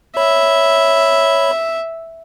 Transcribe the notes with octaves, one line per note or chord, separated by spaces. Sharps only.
C#5 E5 B5